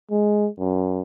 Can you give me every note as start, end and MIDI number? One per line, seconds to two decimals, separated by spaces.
0.11 0.47 56
0.59 1.02 42